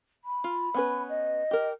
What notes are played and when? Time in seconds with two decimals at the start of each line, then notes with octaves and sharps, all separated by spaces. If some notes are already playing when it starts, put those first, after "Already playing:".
0.24 B5
0.44 F4
0.74 B3 C#4 B4
1.08 D#5
1.51 G4 A#4